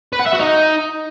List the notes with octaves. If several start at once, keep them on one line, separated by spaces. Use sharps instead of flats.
B4
F#5
E5
F#4
D#4